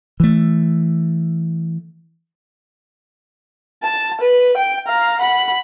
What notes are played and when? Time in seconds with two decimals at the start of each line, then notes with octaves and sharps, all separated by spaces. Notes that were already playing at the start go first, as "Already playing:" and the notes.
0.20 E3 A3
3.83 A5
4.21 B4
4.57 G5
4.88 F5 A#5
5.21 F#5 B5